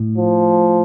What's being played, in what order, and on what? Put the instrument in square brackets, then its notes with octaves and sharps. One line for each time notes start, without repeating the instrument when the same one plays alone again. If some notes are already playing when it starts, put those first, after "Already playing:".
Already playing: [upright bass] A2
[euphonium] F3